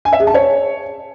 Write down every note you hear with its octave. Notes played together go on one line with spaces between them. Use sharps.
G#5
E5
G#4
A5
C#5